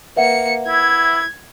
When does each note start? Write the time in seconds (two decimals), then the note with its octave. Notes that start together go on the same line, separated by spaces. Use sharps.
0.17 A#3 B4 E5 F#5 C#7
0.68 E4 G#6